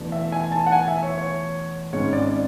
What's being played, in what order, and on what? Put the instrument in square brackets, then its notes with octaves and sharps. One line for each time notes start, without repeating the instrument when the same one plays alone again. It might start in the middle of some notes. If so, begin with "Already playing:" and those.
Already playing: [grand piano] E2 B2 A3 D4
E5
G#5
A5
F#5
G#5
E5
C#5
C#5
G#1 G#2 G#3 C#4 C#5
D5